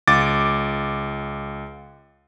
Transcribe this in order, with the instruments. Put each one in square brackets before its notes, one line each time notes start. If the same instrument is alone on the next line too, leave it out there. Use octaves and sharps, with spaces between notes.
[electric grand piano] C#2 D6 A6